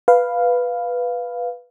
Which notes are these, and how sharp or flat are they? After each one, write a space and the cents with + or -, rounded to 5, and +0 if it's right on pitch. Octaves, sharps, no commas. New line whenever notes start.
B4 +0 F5 +0